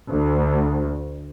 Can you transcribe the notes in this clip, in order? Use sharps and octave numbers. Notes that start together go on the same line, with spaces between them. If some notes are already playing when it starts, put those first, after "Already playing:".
D2